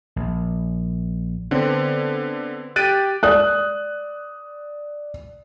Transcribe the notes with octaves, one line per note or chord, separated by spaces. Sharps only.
A#1
D3 B3 C4
G4 F#6 A6 D7 D#7
D5 D#6 F#6